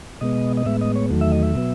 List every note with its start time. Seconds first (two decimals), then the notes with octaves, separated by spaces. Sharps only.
0.21 B2 G#3 B3 D#5
0.57 D#5
0.66 A2 G#3 B3 E5
0.81 D#5
0.96 C#5
1.11 E2 D#3 F#3 A3
1.21 E5
1.32 D#5
1.43 E5
1.55 B2 F#3 B3